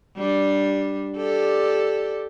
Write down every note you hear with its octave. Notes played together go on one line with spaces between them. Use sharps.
G3 D4
G4 A4 D5